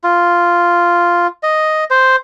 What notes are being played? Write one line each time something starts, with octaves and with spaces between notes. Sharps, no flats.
F4
D#5
C5